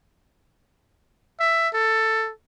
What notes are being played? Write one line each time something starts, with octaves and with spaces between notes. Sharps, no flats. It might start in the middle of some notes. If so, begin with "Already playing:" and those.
E5
A4